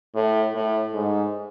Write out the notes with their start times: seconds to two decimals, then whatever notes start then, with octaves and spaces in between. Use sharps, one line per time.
0.15 A2
0.54 A2
0.94 G#2